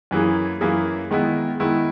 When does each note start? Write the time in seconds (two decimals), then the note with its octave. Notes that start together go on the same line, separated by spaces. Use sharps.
0.11 F#2 E3 A#3 E4 G#4
0.61 F#2 E3 A#3 E4 G#4
1.11 D#3 G#3 B3 E4
1.60 D#3 G#3 B3 E4